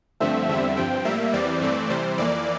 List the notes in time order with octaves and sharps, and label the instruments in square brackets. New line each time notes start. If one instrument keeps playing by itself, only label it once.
[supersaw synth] G2 D3 F3 A3 C4 E5
E2 D3 G3 C4 E5
G2 F3 C4 G5
A2 G3 A#3 E5
E2 E3 G3 C4 D5
G2 E3 A3 C4
C3 E3 G3 C5
F2 E3 A#3 D5